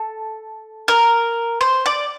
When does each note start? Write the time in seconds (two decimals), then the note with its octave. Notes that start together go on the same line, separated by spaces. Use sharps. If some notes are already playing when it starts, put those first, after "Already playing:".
Already playing: A4
0.88 A#4
1.61 C5
1.86 D5